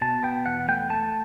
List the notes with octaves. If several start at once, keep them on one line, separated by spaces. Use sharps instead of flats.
B2 A5
B3 G5
E2 F#5
A3 G5
A3 A5